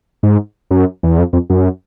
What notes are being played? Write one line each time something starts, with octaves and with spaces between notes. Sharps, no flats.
G#2
F#2
E2
F2
F2
F#2